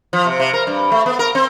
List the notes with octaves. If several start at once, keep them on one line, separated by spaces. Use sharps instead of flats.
F3
C3
C3
A#4
G2
A3
B3
A#4
C4